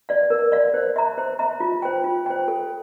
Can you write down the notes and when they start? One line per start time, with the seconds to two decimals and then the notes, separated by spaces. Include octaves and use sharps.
0.09 D5 F5
0.30 A#4
0.52 D5 F5
0.74 C5
0.96 E5 A#5
1.18 C5
1.39 E5 A#5
1.60 F4
1.82 C5 G5
2.04 F4
2.26 C5 G5
2.48 A4